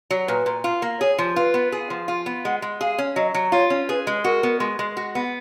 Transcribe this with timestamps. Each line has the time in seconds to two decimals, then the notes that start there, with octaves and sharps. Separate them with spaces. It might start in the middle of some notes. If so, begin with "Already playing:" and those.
0.11 F#3
0.28 A#2 B4
0.46 A#2
0.64 F4
0.82 A#3
1.00 G#4 C#5
1.18 F3
1.36 F4 B4
1.54 B3
1.72 G#4
1.90 F3
2.08 F4
2.26 B3
2.45 G#3 F#5
2.62 G#3
2.80 G#4 F5
2.98 C#4
3.16 F#3 D#5
3.34 F#3
3.52 F4 C#5
3.70 C#4
3.88 G#4 B4
4.07 G#3
4.24 F#4 A#4
4.43 B3
4.60 G#3
4.79 G#3
4.97 F#4
5.15 B3